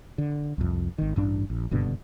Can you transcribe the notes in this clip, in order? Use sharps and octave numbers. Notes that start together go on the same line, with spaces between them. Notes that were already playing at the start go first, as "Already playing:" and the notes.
D3
C2 F2
G#1 D#3
A1 G2 D4
A#1
F#1 G2 B2 D3